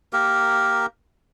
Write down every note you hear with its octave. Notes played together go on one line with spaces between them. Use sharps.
A#3 G4 A#4